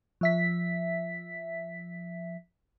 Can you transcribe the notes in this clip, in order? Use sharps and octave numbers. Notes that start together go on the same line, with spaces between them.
F3 E5 B6